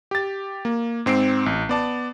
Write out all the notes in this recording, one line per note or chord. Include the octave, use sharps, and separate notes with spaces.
G4 A6
A#3
G#2 C4 C7 D7
A1
B3 D5 A5